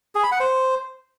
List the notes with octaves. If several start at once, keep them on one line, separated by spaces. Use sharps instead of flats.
G#4
B5
F#5
C5